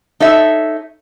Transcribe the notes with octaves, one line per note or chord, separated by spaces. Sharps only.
D#4 A4 C#5 E5